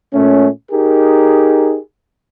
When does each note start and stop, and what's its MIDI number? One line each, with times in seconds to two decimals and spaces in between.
0.14 0.48 46
0.14 0.48 57
0.14 0.48 61
0.71 1.78 63
0.71 1.78 67
0.71 1.78 68
0.71 1.78 70